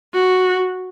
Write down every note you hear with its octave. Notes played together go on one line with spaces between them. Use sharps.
F#4